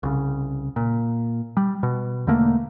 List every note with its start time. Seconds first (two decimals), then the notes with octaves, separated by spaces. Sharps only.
0.03 C2 C#3
0.76 A#2
1.57 G3
1.83 B2
2.27 E2 D3 A3 A#3